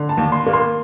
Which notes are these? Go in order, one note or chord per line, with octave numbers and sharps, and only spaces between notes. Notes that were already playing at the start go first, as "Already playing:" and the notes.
Already playing: D3
A5
D#2
C6
A#3
C6